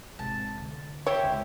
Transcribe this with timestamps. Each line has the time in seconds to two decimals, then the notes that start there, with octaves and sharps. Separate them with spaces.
0.19 G#1 C3 A5
0.58 D2
1.06 E4 G4 C5 C#5
1.23 C#2